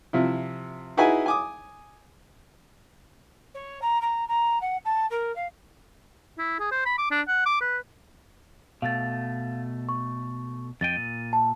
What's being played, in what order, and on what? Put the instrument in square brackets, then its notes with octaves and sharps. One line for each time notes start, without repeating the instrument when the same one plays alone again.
[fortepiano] C3 F3 E4
D#4 E4 F#4 G#4 B4 G#5
G#5 D6 D#6
[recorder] C#5
A#5
A#5
A#5
F#5
A5
A#4
F5
[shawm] E4
G#4
C5
B5
D6
D4
F#5
D6
B4
[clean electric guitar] B2 A3 [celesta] F5 A6
[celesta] C#6
[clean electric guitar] F2 D#5 G5 [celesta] A6 D#7
[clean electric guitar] A#2
[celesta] A5